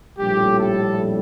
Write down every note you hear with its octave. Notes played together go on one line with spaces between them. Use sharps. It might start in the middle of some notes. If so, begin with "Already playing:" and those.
A#1 A2 G3 G4
A4